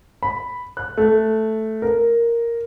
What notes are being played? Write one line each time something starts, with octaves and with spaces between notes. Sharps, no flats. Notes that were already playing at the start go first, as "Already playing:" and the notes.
B5
F#6
A3
A#4